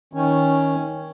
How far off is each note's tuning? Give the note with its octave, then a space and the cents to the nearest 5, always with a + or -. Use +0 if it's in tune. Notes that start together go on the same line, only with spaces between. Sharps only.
D#3 +20 C#4 +0